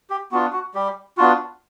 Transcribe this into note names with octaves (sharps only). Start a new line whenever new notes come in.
G4
B3 D4 F4 F#4
F#4
G3 G4
B3 D4 F4 F#4